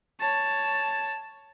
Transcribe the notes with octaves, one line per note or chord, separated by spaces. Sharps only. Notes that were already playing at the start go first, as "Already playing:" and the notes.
C#5 A5